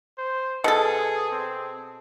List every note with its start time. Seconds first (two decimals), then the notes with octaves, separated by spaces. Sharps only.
0.18 C5
0.64 B2 G#4 A4
1.31 C4